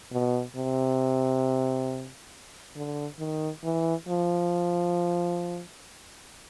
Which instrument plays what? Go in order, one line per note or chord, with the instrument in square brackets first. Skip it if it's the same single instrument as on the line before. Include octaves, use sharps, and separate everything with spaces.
[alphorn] B2
C3
D3
D#3
E3
F3